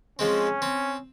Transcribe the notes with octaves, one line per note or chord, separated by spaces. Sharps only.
F3 G#3 C4 C#4
C4